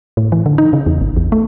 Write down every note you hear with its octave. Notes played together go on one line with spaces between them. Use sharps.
A2
E3
D3
D#4
C#3
E2
G#1
E2
A3